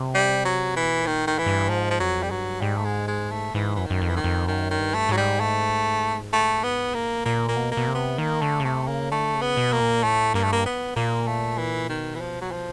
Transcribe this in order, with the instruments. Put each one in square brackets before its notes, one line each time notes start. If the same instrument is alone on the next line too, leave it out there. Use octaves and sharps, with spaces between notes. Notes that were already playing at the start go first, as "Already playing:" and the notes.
Already playing: [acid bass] C3
[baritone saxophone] G3
F#3
[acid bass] B2 [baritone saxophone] E3
[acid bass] A#2
[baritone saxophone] D#3
[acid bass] A2 [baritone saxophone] D#3
[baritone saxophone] E3
[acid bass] G2
[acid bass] G#2 [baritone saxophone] F3
[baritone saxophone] F3
[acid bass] F2 [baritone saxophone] F#3
[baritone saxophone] G3
[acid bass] G2 [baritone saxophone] F#3
[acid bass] G#2 [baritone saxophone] G3
[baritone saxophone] A3
G#3
G#3
A3
[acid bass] G#2 [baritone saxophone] E3
[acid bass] F#2 [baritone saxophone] E3
[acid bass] F#2 [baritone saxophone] D#3
[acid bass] F2
[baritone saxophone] E3
D#3
[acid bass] F2
[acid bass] F#2 [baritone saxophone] D#3
[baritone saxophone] D#3
[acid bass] G2
[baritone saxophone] A3
[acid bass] G#2 [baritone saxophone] F#3
[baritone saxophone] G3
A3
A3
B3
A#3
[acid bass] B2
[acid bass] A#2 [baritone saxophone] A#3
[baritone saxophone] A#3
[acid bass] B2
[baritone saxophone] A#3
[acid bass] B2
C3
[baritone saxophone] B3
[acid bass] D#3 [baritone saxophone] A#3
[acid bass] D3 [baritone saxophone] A3
[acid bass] C#3
[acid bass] C3 [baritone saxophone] A3
[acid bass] C#3 [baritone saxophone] A#3
[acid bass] D3 [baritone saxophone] A3
[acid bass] C#3
[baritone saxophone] B3
[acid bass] B2
[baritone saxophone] A#3
[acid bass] A#2
[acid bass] A2 [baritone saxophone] A3
[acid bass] G2 [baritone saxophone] A#3
[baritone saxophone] A3
A#3
B3
[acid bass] A#2 [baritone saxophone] A#3
[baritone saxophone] A3
E3
[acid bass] B2 [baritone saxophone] D#3
[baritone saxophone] E3
F3
F#3
F3